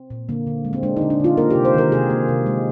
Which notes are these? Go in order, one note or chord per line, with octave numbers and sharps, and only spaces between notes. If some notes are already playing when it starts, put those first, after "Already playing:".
Already playing: C4
A#2
D3 A#3
D3
G#3
C4
G#3 D4
D3 D#4
D4
D3 F4
A#3 A#4
C3 G4
C5
D#3 A#4
C3 G#4
A#3
C3
G#3